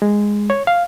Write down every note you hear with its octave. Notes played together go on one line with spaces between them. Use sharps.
G#3
C#5
F5